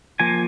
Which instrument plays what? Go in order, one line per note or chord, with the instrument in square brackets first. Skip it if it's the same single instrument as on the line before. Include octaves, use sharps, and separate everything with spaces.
[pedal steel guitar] F3 A#3 G#5